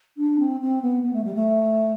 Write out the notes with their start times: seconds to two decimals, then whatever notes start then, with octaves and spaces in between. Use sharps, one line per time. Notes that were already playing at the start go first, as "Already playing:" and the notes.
0.17 D4
0.39 C4
0.61 C4
0.82 B3
1.03 B3
1.13 A3
1.24 G3
1.35 A3